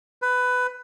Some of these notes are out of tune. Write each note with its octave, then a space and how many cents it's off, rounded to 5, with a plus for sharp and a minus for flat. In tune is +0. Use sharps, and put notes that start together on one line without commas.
B4 +15